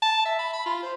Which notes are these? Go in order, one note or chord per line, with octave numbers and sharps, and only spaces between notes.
A5
E5
B5
B5
F4
C5